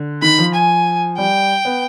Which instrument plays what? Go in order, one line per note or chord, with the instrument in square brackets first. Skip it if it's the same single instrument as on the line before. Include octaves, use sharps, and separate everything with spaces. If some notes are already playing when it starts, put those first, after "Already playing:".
Already playing: [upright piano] D3
[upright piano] D#3 [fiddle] B5
[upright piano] F3
[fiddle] G#5
[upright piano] G3 [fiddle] G5
[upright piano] B3